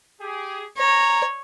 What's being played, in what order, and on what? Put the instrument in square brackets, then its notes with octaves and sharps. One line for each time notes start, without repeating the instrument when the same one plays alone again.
[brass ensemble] G4 G#4
[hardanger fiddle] C#5 [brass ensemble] A#5